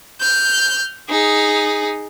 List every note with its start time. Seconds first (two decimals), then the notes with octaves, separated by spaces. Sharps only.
0.21 F6 G6
1.09 D#4 G#4